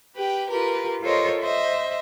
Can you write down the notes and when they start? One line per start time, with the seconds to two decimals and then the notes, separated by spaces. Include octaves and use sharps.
0.16 G4 B4 G5
0.50 F4 G4 A#4 B4
1.02 F4 A4 A#4 C5 C#5 D#5
1.41 C5 D#5 E5